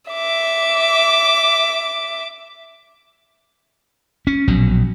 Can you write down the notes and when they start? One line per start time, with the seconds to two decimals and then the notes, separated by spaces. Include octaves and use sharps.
0.11 E5 D6
4.27 C#4
4.48 A#1 B2 F#3